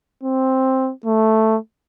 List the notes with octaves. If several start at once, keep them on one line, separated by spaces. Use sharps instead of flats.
C4
A3